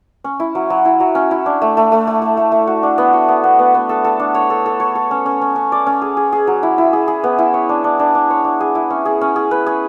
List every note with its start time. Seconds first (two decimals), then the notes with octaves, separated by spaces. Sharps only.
0.24 C#4
0.40 E4
0.55 F#3
0.70 F#3
0.85 E4
1.00 F#3
1.15 C#4
1.31 E4
1.46 D4
1.62 A3
1.77 A3
1.92 A3
2.07 A3
2.22 A3
2.37 A3
2.52 A3
2.67 F#4
2.83 D4
2.98 B3
3.13 F#4
3.28 B3
3.44 B3
3.59 B3
3.75 B3
3.89 A4
4.04 A4
4.20 D4
4.35 C#5
4.50 A4
4.66 A4
4.80 C#5
4.95 A4
5.11 C#4
5.26 C#4
5.41 C#4
5.56 C#4
5.72 D5
5.87 C#4
6.02 G#4
6.17 G#4
6.32 G#4
6.47 F#3
6.63 E4
6.78 E4
6.93 G#4
7.08 G#4
7.24 B3
7.39 E4
7.54 C#5
7.69 D4
7.84 D4
7.99 D4
8.15 D4
8.30 C#5
8.44 D4
8.61 G#4
8.75 E4
8.90 C#4
9.05 G#4
9.21 C#4
9.36 G#4
9.51 B4
9.66 G#4